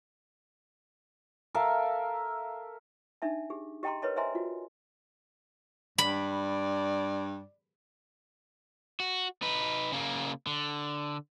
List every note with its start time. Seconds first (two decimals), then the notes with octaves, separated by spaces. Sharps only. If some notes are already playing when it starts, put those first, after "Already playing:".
1.54 A4 A#4 E5 F5
3.22 D4 D#4 E5 A5
3.50 G4 G#4
3.83 G4 D#5 G5 A5 A#5 C6
4.02 A#4 B4 C#5 D#5 A5
4.16 C5 D#5 E5 G#5 A#5 C6
4.35 F4 F#4
5.98 G2 D5 B5
9.00 F#4
9.42 D#4 B4
9.92 C#3 A#3
10.47 D3